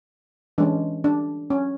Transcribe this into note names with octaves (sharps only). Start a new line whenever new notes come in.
E3 G#3 C#4 D4
D4
C#4